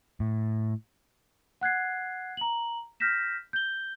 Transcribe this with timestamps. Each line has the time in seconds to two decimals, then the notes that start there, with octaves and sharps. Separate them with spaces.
0.20 A2
1.61 F#5 F#6 G#6 C7
2.37 A#5 F#7
3.00 F6 G6 A#6 B6 E7
3.53 G6 G7